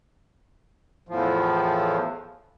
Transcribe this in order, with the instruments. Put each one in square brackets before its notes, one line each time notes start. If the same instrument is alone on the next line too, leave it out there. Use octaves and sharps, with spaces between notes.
[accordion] E2 A2 F3